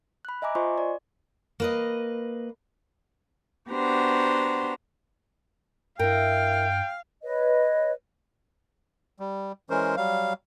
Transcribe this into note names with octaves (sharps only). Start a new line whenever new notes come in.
B5 F#6
D#5 E5 G#5 A#5 D6
F4 C5 D#5 G#5 C6 C#6
D5
A#3 B4 D#5
B3 D4 F#4 G4 C5 A#5
G2 E4 A#4 F5 G5
B4 C#5 D#5
G3
E3 G#3 C#4 A#4 C5
F#3 G3 F5